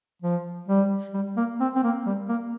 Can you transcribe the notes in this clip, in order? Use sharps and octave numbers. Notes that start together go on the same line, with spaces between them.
F3
G3
G3
A#3
C4
C4
A#3
G3
A#3